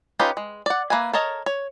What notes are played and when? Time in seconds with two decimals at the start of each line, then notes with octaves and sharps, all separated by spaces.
0.19 C#4 D#4 F4 G4 B4
0.37 G#3
0.66 D5 F#5
0.90 A#3 B4 E5 G#5
1.13 A4 A#4 C#5 D#5 A5
1.46 C#5